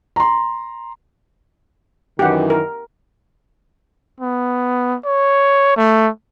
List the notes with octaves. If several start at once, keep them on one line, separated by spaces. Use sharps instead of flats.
A#5 C6
F#2 D#3 E3 G4 F#5
A#4
B3
C#5
A3